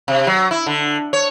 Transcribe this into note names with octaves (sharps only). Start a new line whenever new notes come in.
C3
F#3
E4
D3
C#5